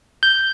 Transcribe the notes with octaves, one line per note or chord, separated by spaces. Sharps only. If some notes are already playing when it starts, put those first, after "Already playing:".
G6